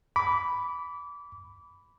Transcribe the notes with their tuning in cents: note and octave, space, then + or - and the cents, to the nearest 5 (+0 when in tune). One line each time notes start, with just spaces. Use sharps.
B5 +0 D6 -25